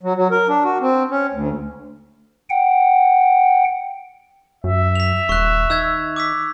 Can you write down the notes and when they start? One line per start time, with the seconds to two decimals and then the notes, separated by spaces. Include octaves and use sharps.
0.03 F#3
0.16 F#3
0.31 A#4
0.49 D4
0.64 F#4
0.81 C4
1.11 C#4
1.33 D2
2.50 F#5 G5
4.64 F#2 E5
4.96 B6 F7
5.29 D#1 C#6 F#6
5.70 D#3 E6 G6 G#6
6.16 D6 E6 B6